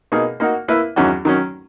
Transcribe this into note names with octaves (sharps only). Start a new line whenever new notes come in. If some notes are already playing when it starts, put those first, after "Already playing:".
B2 A#3 D#4 G#4
A#3 D#4 F#4
A#3 E4 B4 E5
E2 D#3 F#3 C#4 F#4
D#3 F#3 C#4